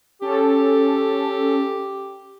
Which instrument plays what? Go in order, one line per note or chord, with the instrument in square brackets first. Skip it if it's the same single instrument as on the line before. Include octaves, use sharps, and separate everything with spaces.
[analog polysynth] C#4 A4 [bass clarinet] G4